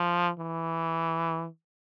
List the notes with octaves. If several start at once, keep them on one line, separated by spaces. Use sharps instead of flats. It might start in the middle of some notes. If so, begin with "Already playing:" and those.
Already playing: F3
E3